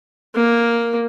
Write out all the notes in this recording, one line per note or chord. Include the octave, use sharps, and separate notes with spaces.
A#3